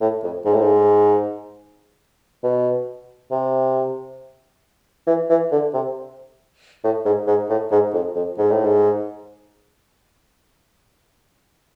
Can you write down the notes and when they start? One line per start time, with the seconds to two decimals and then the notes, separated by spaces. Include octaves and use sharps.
0.01 A2
0.24 F2
0.45 G#2
0.54 A2
0.61 G#2
2.44 B2
3.32 C3
5.07 E3
5.30 E3
5.52 D3
5.73 C3
6.84 A2
7.06 G#2
7.28 G#2
7.50 A2
7.71 G#2
7.94 F2
8.16 F2
8.38 G#2
8.51 A2
8.64 G#2